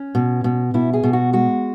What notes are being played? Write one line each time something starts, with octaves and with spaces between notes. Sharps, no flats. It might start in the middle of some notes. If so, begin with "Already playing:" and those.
Already playing: C#4
B2
B2
B2 E4
G#4
B2
F#4
G#3 F#4